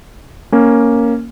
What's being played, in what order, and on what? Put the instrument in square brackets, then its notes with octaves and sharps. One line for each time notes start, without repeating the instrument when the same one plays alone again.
[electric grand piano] A#3 C#4